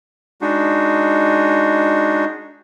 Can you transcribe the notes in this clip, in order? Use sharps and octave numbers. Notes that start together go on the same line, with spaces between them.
G#3 D4 D#4 F#4